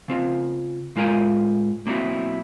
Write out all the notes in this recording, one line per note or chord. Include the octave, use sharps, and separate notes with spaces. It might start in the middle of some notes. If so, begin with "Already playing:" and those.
C#3 C4 F4
A2 G#3 F4 A#4 G5 G#5
B1 A#3 C4 E4 F#4